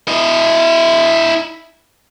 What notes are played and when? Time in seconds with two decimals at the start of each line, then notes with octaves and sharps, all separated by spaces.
0.08 E4 D#5